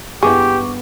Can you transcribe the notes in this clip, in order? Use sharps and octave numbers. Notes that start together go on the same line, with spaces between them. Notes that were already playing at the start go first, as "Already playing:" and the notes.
G2 B3 E4 G4 G#4 C#6 D6